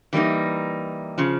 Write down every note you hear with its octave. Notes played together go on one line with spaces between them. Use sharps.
E3 G3 A#3 D#4
C#3 F3